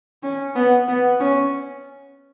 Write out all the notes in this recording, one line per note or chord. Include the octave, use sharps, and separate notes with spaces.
C#4
B3
B3
C#4